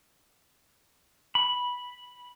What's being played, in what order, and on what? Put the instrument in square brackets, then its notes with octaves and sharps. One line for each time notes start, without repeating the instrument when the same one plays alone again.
[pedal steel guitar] B5